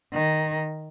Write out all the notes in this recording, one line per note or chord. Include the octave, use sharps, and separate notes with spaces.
D#3